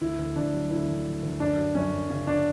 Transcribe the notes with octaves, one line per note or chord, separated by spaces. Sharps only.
D2 E4
D2
D2 D4
F#3
D2 E4
D2
F#3
D2
F#2 D4
F#3
F#2 C#4
F#2
C#3 C#4
D4